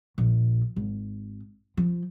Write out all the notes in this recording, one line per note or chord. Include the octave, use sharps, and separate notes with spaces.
A#1
G#1
F3